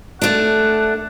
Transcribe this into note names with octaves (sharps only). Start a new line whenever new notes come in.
A3 D4 F#5